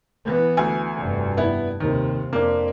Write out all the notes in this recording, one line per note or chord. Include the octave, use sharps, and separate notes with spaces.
E3 B3
D2 G#5
F1 G2
B3 E4
D#2 C3 D#3
F2 A#3 D4